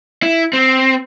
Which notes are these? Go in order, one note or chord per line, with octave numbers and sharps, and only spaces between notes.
E4
C4